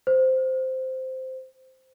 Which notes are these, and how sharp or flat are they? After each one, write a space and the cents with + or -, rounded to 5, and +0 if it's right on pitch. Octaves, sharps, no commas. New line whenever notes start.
C5 -10